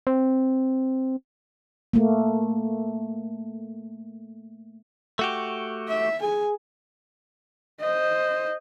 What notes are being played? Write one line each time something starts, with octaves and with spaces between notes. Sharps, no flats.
C4
A3 A#3
A3 F#4 G4
E5
G#4 G#5
C5 D#5